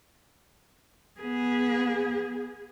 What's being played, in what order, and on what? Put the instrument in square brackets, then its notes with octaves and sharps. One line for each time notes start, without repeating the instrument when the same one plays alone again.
[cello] B3 G#4